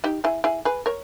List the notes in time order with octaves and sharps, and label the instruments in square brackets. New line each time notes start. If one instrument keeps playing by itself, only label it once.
[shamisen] D#4 G4
E4 G#4
E4 G#4
G#4 B4
A#4 C#5